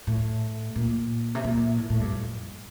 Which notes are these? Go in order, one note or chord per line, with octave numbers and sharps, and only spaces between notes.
A2
A#2
C3
A#2
A2
A2
G2
F2